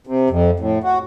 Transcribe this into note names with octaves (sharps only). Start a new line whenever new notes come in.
C3
F2
A2
F#4